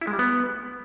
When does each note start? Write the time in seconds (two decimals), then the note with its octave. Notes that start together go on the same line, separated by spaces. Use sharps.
0.01 E4
0.07 G#3
0.13 G3
0.19 B3